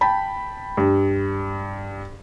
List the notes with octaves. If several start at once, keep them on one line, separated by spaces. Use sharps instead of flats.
G5 A5 B5
G2